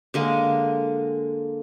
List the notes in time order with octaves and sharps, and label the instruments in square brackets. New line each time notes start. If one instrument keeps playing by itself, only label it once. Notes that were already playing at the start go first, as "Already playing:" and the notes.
[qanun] D3 G#3 A#3